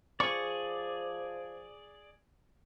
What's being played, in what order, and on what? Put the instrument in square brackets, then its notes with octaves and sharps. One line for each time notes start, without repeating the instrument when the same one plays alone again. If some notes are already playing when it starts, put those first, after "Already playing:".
[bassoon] F3 [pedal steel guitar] G#4 D5 [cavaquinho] C#6